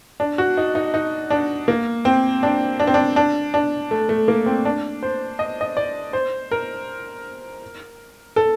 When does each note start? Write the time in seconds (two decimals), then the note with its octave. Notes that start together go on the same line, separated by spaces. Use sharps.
0.20 D4
0.38 F#4
0.57 D#4
0.75 D#4
0.94 D#4
1.30 D4
1.68 A#3
2.05 C4
2.43 D4
2.80 D4
2.87 C4
2.94 D4
3.16 D4
3.54 D4
3.91 A3
4.09 A3
4.28 A#3
4.46 C4
4.65 D4
5.03 C5
5.39 D#5
5.61 D#5
5.77 D5
6.13 C5
6.51 A#4
8.36 A4